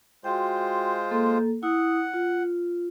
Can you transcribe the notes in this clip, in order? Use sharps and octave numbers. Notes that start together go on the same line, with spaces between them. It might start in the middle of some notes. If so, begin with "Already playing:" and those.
G#3 F4 F#4 C5 G5
A#3 A4
E4 F#5 D#6
F4